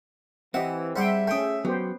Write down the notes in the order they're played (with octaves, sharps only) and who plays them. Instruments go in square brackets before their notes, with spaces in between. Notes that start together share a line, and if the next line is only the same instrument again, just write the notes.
[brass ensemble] E3 [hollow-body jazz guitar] C4 G4 [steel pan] D#5 E5 [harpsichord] F#5
[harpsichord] G3 F#5 D6 [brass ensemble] G#4 E5 [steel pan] C5 G5
[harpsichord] A3 D#6 [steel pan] C#4 G5
[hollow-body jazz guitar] F#3 [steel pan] B3 G4 C5